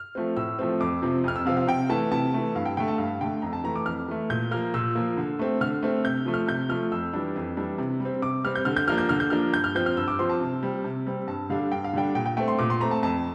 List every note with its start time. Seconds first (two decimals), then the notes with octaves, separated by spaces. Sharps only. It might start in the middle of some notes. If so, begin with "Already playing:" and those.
Already playing: F6
0.15 F3 A3 C4
0.37 A2 E6
0.59 F3 A3 C4
0.80 F2 D6
1.02 C3 F3 C4
1.24 F2 F6
1.36 E6
1.45 C3 F3 C4 F5
1.57 F5
1.67 C3 G5
1.89 E3 A3 A5
2.11 C3 A5
2.34 E3 A3
2.55 G2 F5
2.66 G5
2.77 D3 A3 G5
2.88 A5
2.98 G2 F5
3.21 D3 A3 G5
3.42 F2 A#5
3.53 A5
3.64 E3 A3 A#5
3.76 D6
3.86 F2 F6
4.08 E3 A3
4.30 A#2 G6
4.51 F3 A#3 F6
4.74 A#2 E6
4.95 F3 A#3
5.17 D3
5.39 A3 C4
5.61 D3 F6
5.83 A3 C4
6.04 C3 G6
6.26 F3 A3
6.34 F6
6.48 C3 G6
6.69 F3 A3 F6
6.92 F2 E6
7.13 E3 G3 D4
7.36 F2
7.57 E3 G3 D4
7.78 C3
8.00 G3
8.05 C4
8.22 C3 D6
8.45 G3 C4 F6
8.55 G6
8.65 D3 F6
8.77 G6
8.88 F3 A#3 D4 F6
8.98 G6
9.09 D3 F6
9.20 G6
9.30 F3 A#3 D4 F6
9.53 G2 G6
9.64 F6
9.75 F3 C4 G6
9.86 F6
9.96 G2 E6
10.08 D6
10.19 F3 C4 C6
10.29 A5
10.41 C3
10.63 G3 C4
10.84 C3
11.07 G3 C4
11.28 G2 A5
11.50 D3 G3 D4 F5
11.72 G2 G5
11.84 F5
11.93 D3 G3 D4 G5
12.15 A#2 G5
12.26 G5
12.37 A3 C4 G5
12.48 C6
12.59 A#2 D6
12.70 C6
12.80 A3 C4 A#5
12.91 A5
13.03 F2 A5